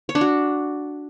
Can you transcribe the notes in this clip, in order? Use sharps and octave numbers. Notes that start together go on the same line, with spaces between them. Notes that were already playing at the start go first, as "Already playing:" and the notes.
C#5
D4
F#4